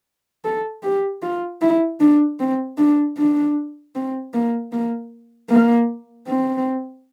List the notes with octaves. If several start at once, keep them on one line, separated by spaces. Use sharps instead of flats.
A4
G4
F4
E4
D4
C4
D4
D4
C4
A#3
A#3
A#3
C4